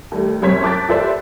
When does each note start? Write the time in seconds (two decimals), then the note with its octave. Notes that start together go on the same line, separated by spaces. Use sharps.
0.12 D#2 G3 A3
0.42 C2 F#2 C5 C#5 B6
0.63 A5 D6 F#6 G6 A6 B6
0.88 G4 A4 B4 C5 D5 E5